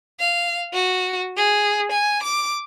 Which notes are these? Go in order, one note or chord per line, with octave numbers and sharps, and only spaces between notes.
F5
F#4
G#4
G#5
D6